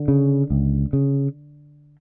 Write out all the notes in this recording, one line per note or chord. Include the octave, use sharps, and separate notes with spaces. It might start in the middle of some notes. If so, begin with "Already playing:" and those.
Already playing: D3
C#3
C#2
C#3